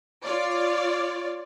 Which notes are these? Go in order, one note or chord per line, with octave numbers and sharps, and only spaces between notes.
F4 C#5 D5